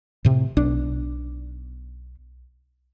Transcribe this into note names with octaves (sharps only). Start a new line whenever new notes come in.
A2 C3
B1 D4